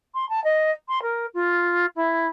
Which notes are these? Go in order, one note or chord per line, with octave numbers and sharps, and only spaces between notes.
C6
A5
D#5
C6
A#4
F4
E4